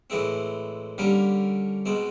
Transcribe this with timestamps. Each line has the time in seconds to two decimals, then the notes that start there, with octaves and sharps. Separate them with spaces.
0.10 A2 E3 G#3 C4
0.98 D3 G3 A#3 C#4
1.86 B2 G#3 C4